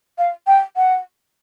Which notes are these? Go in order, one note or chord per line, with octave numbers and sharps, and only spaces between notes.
F5
G5
F#5